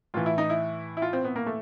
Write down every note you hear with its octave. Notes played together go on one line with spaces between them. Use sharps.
A2 E3 F4
E4
D#4
E4
E4
F4
C4
B3
A#3
A3